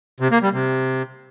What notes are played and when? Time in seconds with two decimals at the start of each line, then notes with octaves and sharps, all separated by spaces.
0.20 C3
0.31 A#3
0.42 G3
0.54 C3